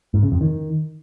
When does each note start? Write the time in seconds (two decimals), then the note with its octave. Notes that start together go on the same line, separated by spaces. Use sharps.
0.14 G#2
0.23 C#3
0.32 F2
0.41 D#3